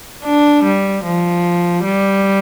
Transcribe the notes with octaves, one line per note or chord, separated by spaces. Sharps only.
D4
G3
F3
G3